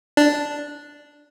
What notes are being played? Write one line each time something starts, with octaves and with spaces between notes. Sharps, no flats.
D4